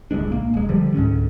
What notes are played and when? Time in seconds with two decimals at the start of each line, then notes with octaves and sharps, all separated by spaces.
0.11 D1 C#2 G#3 D4
0.28 A#1 A#3
0.54 D#1 G#3
0.69 D3 F3 G3
0.94 C#2 G#2 D3 C#4